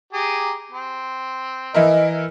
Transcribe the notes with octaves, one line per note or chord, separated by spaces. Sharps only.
G4 G#4 A#5
C4
E3 E4 A#4 D#5